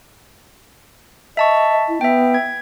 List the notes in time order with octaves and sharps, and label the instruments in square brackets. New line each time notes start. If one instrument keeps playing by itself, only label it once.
[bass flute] D#5 [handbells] E5 A5 C#6
[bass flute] E4
[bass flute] B3 [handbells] E5 G5
[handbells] G#6